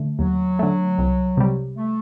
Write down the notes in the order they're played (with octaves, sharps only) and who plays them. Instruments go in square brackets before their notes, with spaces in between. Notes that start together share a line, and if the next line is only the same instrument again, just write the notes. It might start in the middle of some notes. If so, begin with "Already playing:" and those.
Already playing: [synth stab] D3 A3
[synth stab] D#2 [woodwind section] F#3
[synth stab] D3 A3
C2
C3 G3
[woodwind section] A3